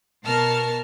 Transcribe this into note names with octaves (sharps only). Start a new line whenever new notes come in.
B2 A#4 A5 F6